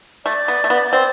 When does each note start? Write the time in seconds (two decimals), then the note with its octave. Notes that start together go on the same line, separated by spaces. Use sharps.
0.25 A3 D5
0.48 B3
0.64 A3
0.70 B3
0.93 C4